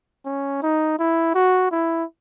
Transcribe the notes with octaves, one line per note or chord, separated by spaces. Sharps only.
C#4
D#4
E4
F#4
E4